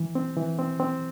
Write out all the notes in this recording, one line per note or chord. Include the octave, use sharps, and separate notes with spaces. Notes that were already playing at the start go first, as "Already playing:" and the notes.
Already playing: E3
C4
E3
C4
C4